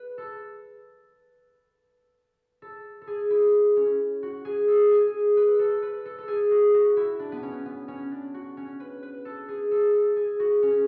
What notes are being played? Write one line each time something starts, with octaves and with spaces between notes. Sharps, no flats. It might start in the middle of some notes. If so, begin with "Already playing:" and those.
Already playing: B4
A4
A4
A4
G#4
E4
C#4
F#4
G#4
A4
G#4
B4
A4
B4
A4
A4
G#4
F#4
F#4
E4
D4
B3
C#4
B3
C#4
D4
F#4
C#4
B4
B4
A4
G#4
A4
A4
G#4
F#4
C#4